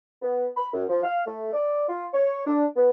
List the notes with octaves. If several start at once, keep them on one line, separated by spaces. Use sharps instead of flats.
B3
B5
F#2
F3
F5
A3
D5
F4
C#5
D4
B3